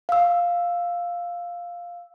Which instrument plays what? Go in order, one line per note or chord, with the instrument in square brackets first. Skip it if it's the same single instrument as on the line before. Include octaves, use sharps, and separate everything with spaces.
[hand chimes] F5 E6